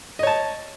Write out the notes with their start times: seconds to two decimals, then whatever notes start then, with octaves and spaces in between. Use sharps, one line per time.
0.19 D#5
0.23 C#5
0.27 A5